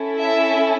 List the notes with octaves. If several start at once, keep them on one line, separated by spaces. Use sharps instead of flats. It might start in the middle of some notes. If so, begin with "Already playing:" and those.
Already playing: C#4 E4 A4
E5